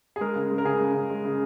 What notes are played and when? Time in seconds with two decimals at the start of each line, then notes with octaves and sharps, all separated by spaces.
0.16 G#4
0.21 G#3 A#4
0.35 C#3
0.51 G#3
0.58 A#4
0.65 C#3 G#4
0.80 G#3
0.94 C#3
1.10 G#3
1.24 C#3